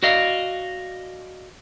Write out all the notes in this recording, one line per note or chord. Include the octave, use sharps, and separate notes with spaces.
F#4 D5 D#5 F5